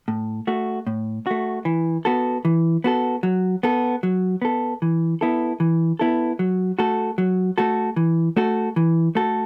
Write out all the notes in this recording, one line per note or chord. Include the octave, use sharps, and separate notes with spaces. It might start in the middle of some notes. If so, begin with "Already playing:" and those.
A2
A3 F#4
A2
A3 F#4
E3
B3 F#4 A4
E3
B3 F#4 A4
F#3
B3 A4
F#3
B3 A4
E3
B3 E4 A4
E3
B3 E4 A4
F#3
A3 F#4 A4
F#3
A3 F#4 A4
E3
A3 F#4 A4
E3
A3 F#4 A4